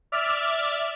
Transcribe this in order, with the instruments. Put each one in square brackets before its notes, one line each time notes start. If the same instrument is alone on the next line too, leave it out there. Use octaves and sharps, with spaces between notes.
[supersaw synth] D5 E5 F6